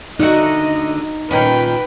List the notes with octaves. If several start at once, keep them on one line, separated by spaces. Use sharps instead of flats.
D3 A3 D#4 F#4 D#5
A#2 D#3 C#4 B4 G5